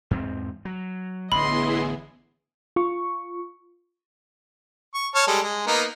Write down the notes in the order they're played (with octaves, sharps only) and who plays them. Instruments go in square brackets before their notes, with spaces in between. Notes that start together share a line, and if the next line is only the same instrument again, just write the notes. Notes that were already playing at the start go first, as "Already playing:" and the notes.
[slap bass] E2 G#2 C4
F#3
[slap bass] A1 D3 [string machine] B3 E4 G#4 [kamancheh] D#5 C6 [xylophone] B5
[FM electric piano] F4 C#6
[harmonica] C#6
C#5 A5 F6
G3 G#3 A4
G#3
A#3 B3 D#4